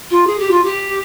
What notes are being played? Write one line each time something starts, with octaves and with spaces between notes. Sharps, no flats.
F4
G#4
G4
F4
G4